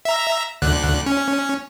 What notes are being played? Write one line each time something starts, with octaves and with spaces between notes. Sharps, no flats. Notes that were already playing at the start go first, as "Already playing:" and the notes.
E5 A#5
D2 D3 F#6
C#4